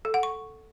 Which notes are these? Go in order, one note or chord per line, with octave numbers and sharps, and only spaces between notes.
A4
F#5
C#6